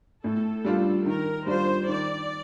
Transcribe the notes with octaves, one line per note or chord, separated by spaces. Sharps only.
A2 A4
G3 D4 F4
D#3 A#4
G3 D4 F4 C5
D#3 D5